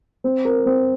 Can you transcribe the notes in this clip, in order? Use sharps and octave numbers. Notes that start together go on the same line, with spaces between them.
C4
A#4
C4